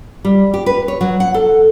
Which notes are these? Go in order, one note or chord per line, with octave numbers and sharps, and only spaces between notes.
G3
G4
B4
C#5
F#3
F#5
A4